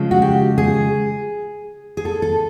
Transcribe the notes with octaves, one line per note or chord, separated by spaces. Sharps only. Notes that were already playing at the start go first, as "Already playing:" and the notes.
Already playing: C#3 F3 G#3
F#4
G4
G#4
G#4
A4
A4